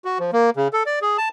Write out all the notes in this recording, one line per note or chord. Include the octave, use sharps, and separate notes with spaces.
F#4
F3
A#3
C#3
A4
D5
G#4
A5